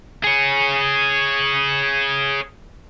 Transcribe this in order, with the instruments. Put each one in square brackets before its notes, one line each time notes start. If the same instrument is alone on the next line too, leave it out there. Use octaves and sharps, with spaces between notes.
[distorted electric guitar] G#4 C#5